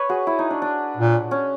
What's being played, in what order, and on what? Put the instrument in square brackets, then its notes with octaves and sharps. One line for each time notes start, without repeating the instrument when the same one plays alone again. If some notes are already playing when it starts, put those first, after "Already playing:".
Already playing: [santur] B4 C#5
F#4 G#4
E4
D#4
D4
D4
[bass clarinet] A#2
[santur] C#4